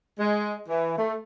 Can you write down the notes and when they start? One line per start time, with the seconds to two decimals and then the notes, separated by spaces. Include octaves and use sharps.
0.20 G#3
0.68 E3
0.98 A3